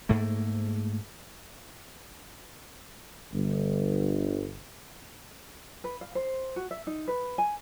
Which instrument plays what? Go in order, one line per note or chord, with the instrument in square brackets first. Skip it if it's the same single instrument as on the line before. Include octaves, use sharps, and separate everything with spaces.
[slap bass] G#2 A3 A#3
[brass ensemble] G1
[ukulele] B4
F5
C5
F#4
E5
D#4
B4
G#5